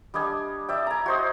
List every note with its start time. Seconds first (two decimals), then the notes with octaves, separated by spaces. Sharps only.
0.14 G3 D4 D#5 G#5
0.69 D5 E5 G5
0.87 G#5 A#5
1.06 F#4 C5 D#5